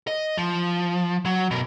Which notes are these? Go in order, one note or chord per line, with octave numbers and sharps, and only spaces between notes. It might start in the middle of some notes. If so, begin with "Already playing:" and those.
D#5
F3
F#3
B2 A#4